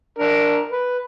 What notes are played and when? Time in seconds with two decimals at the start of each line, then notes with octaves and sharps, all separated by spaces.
0.18 D4 A#4
0.71 B4